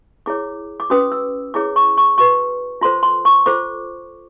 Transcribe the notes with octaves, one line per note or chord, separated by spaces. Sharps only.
E4 G#4 C#5 D6
D6
C#4 F#4 B4 D#6
E6
E4 G#4 C#5 D6
C#6
C#6
F#4 B4 C#6
F4 A4 C5 C6
C6
C#6
F4 A4 C5 D6